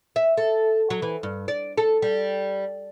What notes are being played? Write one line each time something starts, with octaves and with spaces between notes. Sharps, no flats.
E5
A4
F#3
E3
G2
D5
A4
G3